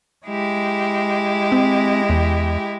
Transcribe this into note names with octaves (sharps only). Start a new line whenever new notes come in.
G#3 E4 G4
C4
E2